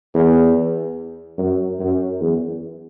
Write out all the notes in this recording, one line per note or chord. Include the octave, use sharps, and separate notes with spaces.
E2
F#2
F#2
E2